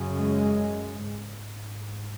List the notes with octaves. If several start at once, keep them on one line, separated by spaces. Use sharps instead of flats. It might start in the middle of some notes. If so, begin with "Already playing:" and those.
Already playing: F#2 C#3
G#3
G#2